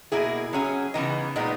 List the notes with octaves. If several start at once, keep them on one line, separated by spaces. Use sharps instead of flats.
B2 A#3 E4 G#4
F#3 C#4 G#4
C#3 E3 B3 D#4
A#2 G#3 B3 D#4